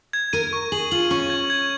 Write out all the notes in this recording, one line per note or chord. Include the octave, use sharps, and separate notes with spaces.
G#6
A#4 D#7
C#6
G#4 F#7
F4 F#7
C#4 C#6
G#6
G#6